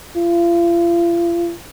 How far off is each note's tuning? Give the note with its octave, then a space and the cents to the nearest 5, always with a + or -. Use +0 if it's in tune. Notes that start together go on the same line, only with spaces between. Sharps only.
F4 -40